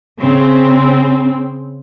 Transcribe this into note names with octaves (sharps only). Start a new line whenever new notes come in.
C#3 C4